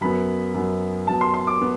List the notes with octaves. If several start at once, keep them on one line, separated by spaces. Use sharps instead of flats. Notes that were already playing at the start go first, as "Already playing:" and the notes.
F#2 F#3 B3 B5
F#2 F#3 B3
F#2 F#3 B3 A5
C6
C6
D6
B3